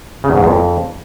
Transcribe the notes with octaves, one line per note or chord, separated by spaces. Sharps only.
C#3
E2
G#2
E2
F2